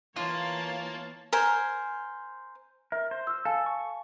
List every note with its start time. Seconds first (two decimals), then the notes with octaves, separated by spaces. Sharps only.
0.16 E3 A#3 F4 C#5 A5
1.33 A#4 C5 G#5
2.92 A#4 E5
3.11 C5
3.27 E6 F6
3.45 A4 F5 G#5 A5
3.66 C#6